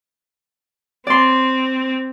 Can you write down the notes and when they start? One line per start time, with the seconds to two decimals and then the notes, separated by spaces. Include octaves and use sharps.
1.07 C4 D5 C6